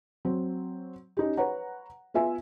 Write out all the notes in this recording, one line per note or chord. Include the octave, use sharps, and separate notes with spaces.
F#3 C4
C#4 D#4 G4
B4 C#5 F#5 A#5
B3 F4 E5 G#5